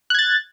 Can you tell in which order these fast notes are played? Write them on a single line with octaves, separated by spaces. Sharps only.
F#6 G#6 A6